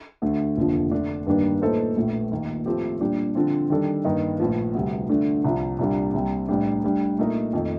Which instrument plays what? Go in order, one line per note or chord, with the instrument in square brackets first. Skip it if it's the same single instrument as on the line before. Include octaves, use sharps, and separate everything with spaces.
[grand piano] D2 D3 A3
F1 D#2 D3 F3
D3 A3 D4
G2 D#3 G3 A#3 D4
A#2 A3 D#4 A4 C5
A#1 A2 A3
D#2 D#3 A#3
A2 F3 A3 C4 G4
A#2 G3 D4 G4
D3 F3 C4
D#3 G3 D4 A4
G2 D#3 A#3 D#4
A#1 A2 F3
D2 C3 G3
D3 A3 D4
C2 C3 F3
C2 A#2 G3 A#3 D4
C2 C3 G3 C4
A1 A2 G3 D4
A2 G3 D4
A#2 A3 D#4 A#4 D#5
F2 D#3 A3 D#4